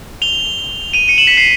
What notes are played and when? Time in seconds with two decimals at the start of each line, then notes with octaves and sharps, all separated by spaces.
0.22 F7 G7
0.93 D#7 F7
1.08 C#7 D#7
1.18 E7 F#7
1.27 B6 C#7
1.38 C7